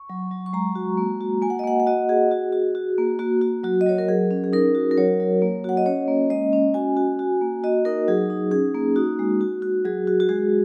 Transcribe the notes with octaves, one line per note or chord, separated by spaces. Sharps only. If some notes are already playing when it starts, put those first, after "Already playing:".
Already playing: C#6
F#3
F#3
C#6
G#3 A#5
F#4
A#3
F#4
A#3 G#5
F#5
D#5
A#3 F#5
F#5
F#4 D#5
F#4 G#4
F#4
F#4
F#4
A#3
A#3 F#4
F#4
F#3 F#4
D#5
F#3 C#5
A#4
F#3 G#4
C#4
G#4
D#4 A#4
F#4
A#4
F#3 C#5
F#3
A#3
F#4 F#5
D#5
C#4 C#5
A#3
G#3 D#5
C#4
F#4 G#5
F#4
F#4
A#3
F#4 D#5
D#4 A#4
F#3 G#4
D#4
C#4 G#4
A#3
D#4 F#4
G#3
F#4
F#4
F#3 G#4
F#4
F#4
G#3 G#4